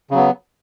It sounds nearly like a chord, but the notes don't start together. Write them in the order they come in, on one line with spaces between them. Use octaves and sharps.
C#3 F#3 B3